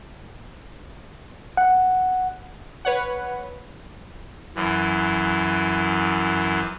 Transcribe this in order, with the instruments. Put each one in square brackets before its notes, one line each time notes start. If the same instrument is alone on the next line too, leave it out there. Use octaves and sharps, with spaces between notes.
[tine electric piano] F#5
[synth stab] B4 C#5 F#5
[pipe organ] F#2 E3